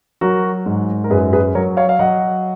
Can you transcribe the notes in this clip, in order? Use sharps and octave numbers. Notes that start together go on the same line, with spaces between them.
F#3 F#4 A#4
G#2
A#4
F#2 G#4 B4
G#4 B4
F#3 A#4 C#5
C#5 F5
F5
F#3 D#5 F#5